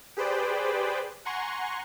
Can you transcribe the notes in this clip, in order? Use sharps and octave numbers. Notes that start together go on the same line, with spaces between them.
G4 G#4 B4 C5 D5 G5
F#5 G#5 A#5 C6 C#6